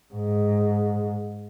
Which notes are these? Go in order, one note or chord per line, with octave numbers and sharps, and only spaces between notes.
G#2